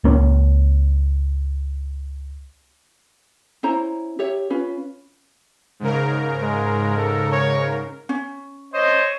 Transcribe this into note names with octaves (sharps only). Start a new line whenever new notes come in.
C#2 A#3 C#4
C#4 E4 C5 A#5
G4 C#5 E5
C#4 F4 B4
G#2 C#3 A#4
G#3
A4
C#5
C#4
A3 C5 C#5 D#5